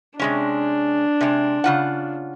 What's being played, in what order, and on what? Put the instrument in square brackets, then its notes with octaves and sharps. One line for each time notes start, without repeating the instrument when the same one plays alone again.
[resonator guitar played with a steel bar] C3 G#3 C#4 [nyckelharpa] D4
[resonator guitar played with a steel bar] C3 G#3
C#3 F4 F#5